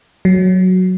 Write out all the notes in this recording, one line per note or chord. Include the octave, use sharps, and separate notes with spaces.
F#3